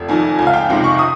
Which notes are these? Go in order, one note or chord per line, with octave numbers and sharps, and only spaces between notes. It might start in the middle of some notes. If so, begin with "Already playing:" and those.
Already playing: F1
F2 D#3 G#5
C#2 G#5
F5
G5
C3 D#3 G#3 G5
C#6
D#6